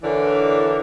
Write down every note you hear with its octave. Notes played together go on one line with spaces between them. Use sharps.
D3 E3 D4 A#4 C#5 D5